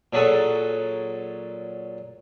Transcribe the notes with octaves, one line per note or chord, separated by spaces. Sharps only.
A#2 F#3 G#4 A4 F#5